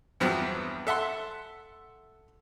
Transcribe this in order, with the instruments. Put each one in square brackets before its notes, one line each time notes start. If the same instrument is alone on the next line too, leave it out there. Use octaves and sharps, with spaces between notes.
[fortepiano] E2 G2 F3 F#3 B3 C4
A4 E5 F#5 C6